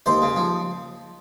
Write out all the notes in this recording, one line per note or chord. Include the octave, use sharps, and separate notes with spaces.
D#2 C5
C#3
F3